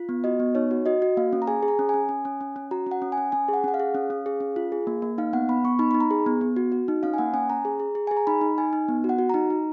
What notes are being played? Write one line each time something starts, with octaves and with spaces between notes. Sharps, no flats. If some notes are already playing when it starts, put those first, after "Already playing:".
Already playing: F4
B3
F#4 D#5
B3
D#4 C#5
F#4
F#4 D#5
F#4
A#3 F5
C#4
A#5
G#4 G#5
G#4
A#5
C#4
C#4 G#5
C#4
C#4
C#4
C#4
F#4 A#5
C#4 F#5
C#4
G#5
C#4
C#4 G#5
G#4
F#5
C#4 F#5
F5
G#4
C#4
C#4
G#4
C#4
F4
G#4
A#3
A#3
D#4 F5
B3 F#5
B3 B5
B3 C#6
D#4 B5
D#4 B5
A#5
G#4
B3
B3
F#4
F#4
D#4
C#4 F5
G#5
A#3 F#5
C#4 G#5
C#4 A#5
G#4
G#4
G#4
G#4 G#5
A#5
D#4 B5
D#4
D#4 G#5
D#4
B3
F#4
F#5
F#4
D#4 A#5
D#4